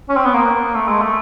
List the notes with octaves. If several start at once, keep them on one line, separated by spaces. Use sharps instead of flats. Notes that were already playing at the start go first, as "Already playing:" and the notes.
C#4
C4
B3
A#3
A3
G#3
A3